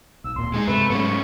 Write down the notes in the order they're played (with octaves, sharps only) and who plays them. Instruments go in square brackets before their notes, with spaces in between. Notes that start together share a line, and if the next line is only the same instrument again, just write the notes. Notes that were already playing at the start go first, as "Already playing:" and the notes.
[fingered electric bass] B1 [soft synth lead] E6
[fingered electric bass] D1 A#2 [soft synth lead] C6
[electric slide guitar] G#3 D#4 G#4
[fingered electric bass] G2 C3 G#3 [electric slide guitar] A3 [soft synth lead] B4
[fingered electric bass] G#2 F#3 [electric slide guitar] A3 B3 C#4 [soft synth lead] C#6